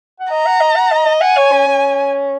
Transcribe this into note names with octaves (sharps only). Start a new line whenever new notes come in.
F#5
D#5 A#5
F#5
D#5
F#5
D#5
D#5
F#5 G#5
C#5
C#4
C#4